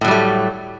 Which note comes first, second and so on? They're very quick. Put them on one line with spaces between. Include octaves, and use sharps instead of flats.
A2 F#3 G3 A3